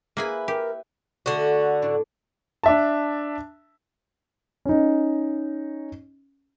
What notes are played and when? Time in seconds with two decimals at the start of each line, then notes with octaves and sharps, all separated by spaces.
0.17 A#3 E4 G#4 B4 G#5
0.48 G4 A#4
1.26 D3 A3 F#4 G5
1.82 A2 D4 D5
2.63 D4 E5 A5
4.65 C#4 D#4